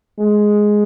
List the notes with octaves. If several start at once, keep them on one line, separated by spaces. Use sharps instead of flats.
G#3